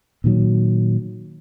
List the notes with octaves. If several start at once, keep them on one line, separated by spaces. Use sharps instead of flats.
A#2 D#3 F#3